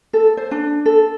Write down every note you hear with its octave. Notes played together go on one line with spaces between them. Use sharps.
A4
C5
D4
A4